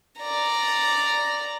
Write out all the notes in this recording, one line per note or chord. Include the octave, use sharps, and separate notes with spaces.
D5 A#5